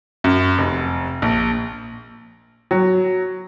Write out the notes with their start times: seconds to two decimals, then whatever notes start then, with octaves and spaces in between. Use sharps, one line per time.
0.24 F#2
0.58 F1
1.22 A#1
2.71 F#3